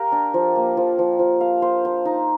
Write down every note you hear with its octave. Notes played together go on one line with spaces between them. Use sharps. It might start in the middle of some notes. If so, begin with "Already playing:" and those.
Already playing: G4 A#4 F5
D4
F3
A#3
F3
F3
F3
F5
C5
C5
D#4